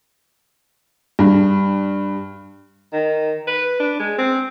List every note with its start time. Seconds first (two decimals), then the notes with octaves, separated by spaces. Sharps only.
1.19 G2
2.93 D#3
3.47 B4
3.80 D4
3.99 G#3
4.18 C4